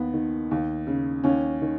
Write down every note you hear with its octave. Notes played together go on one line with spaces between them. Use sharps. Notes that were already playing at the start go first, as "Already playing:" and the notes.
Already playing: D#2 B3
D#3
D#2
C#3
D#2 C#4
D#3